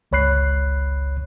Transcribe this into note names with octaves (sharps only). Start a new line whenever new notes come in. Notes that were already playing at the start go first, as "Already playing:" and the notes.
G1 C#2 C#5 B5 F#6 C7